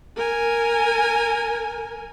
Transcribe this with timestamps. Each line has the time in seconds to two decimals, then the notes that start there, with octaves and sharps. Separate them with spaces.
0.17 A#4 G#5